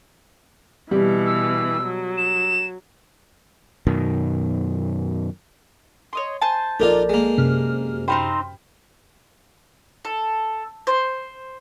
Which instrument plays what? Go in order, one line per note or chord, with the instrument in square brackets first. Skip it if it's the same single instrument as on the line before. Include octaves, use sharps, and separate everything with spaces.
[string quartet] B2 E3 [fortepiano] G3
[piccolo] E6
[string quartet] F#3
[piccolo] E7
[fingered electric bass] F#2 B2 D#3
[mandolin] C#5 D#5 C6
C5 G#5 A5
[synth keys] A#1 [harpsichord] D4 D#4 F4 [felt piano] A4 A#4 D5
[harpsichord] G#3 A#3
[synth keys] F#2 C3 F6
[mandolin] C4 D#4 C5 [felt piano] G5 B5
[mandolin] A4
C5